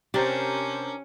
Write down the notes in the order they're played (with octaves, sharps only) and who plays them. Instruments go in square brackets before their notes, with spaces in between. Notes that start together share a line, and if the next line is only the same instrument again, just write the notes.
[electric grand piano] C3 C5 [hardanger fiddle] C#4 [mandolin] D4 A#4 [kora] G4